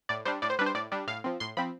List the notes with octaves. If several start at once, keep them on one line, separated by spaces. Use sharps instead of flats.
A2 D5
G3 D4 C5
A2 D5
C5
G3 D4 B4
C5
A2 D5
G3 D4
A2 F5
F3 C4
A2 C6
F3 C4 B5